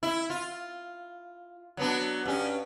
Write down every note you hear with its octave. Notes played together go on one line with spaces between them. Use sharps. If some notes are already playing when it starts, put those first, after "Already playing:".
E4
F4
F#3 B3 D4
G2 C#4